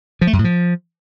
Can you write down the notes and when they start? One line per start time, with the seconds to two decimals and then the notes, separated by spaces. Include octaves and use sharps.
0.21 F3
0.27 A3
0.33 F#2
0.39 A2
0.44 F3